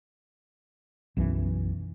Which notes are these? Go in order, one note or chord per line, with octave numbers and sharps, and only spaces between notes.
B1 F#2 E3